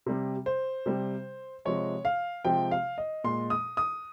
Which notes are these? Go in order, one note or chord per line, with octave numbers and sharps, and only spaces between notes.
C3 G3
C5
C3 G3
C3 F3 G#3 C#5
F5
C3 F3 G#3 G5
F5
D#5
A#2 G#3 C6
D#6
D#6